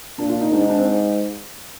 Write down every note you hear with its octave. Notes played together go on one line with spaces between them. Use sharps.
A#2 D4
F4
D#4
G#2 D4
D#4
D4
C4